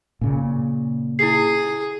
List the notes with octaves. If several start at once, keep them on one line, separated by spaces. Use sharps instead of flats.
A#2 C#3
E4 G#4 C7